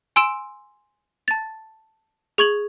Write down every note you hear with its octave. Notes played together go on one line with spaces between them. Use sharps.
G#5 C6 E6 D7 E7
A5 A6
G#4 C#6 G#6 F#7